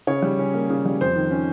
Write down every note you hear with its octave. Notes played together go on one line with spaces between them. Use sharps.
C#3 C#5
G3
C#4
A#3
C#3
G3
F2 C5
D#3
C#4